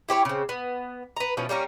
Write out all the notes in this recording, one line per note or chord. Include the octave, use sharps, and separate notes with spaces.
E4 G4 C5 C#5
C#3 C4
B3
B4 A#5
B2 E3 F3 C#4
G3 A#3 C#4 A#4